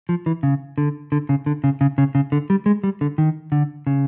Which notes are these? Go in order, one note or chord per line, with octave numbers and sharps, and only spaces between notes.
F3
E3
C#3
D3
D3
C#3
D3
C#3
C#3
C#3
C#3
D3
G3
G#3
G3
D3
D#3
D3
C#3